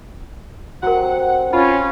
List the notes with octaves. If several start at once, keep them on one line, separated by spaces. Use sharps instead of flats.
C3 F#3 F#4 A#4 C5 F#5
C#4 F4 B5